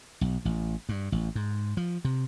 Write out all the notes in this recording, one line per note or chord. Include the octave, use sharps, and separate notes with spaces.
B1
A1
G2
A1
G#2
F3
C3